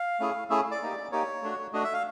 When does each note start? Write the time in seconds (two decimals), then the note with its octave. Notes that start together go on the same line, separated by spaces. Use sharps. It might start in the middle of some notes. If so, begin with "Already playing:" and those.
Already playing: F5
0.20 A3 C#4 E4 G#4
0.50 A3 C#4 E4 G#4 E5
0.71 D5
0.81 A#3 D#4 G4
1.11 A#3 D#4 G4 C#5
1.42 A3 D4 F#4
1.73 A3 D4 F#4 D#5
1.84 E5
1.93 F5